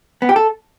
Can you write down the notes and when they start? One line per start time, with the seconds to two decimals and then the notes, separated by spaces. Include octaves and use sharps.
0.22 B3
0.29 G4
0.36 A4